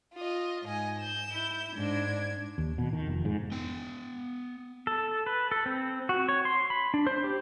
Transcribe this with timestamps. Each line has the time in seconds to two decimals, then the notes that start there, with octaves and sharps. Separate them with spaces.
0.14 F4 D#5
0.64 G#2 D#5 G#5
1.01 G6 E7
1.32 E4
1.76 G#2 D4 G#6
2.58 D#2
2.78 B2
2.93 D#3
3.07 F1
3.25 G#2
3.52 B3 G5
4.87 A4
5.26 B4
5.51 A4
5.66 C4
6.09 F#4
6.29 C#5
6.45 C6
6.70 B5
6.94 D4
7.07 C5
7.24 G4